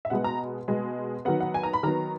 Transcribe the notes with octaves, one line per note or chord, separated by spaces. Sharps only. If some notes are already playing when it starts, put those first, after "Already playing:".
E5
B2 G#3 B3 F#5
A#5
B2 G#3 B3
D#3 F#3 B3 F#5
F#5
G#5
A#5
B5
D#3 F#3 B3 A#5